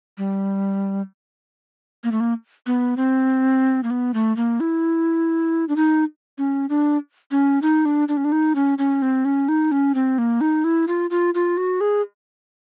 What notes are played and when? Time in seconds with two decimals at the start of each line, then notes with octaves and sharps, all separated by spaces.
0.18 G3
2.04 A#3
2.12 A3
2.20 A#3
2.66 B3
2.97 C4
3.83 A#3
3.91 B3
4.14 A3
4.37 A#3
4.60 E4
5.69 D4
5.76 D#4
6.38 C#4
6.69 D4
7.31 C#4
7.62 D#4
7.85 D4
8.08 D4
8.17 C#4
8.25 D4
8.32 D#4
8.55 C#4
8.78 C#4
9.02 C4
9.25 C#4
9.48 D#4
9.72 C#4
9.95 C4
10.18 A#3
10.41 D#4
10.64 E4
10.88 F4
11.11 F4
11.34 F4
11.57 F#4
11.81 G#4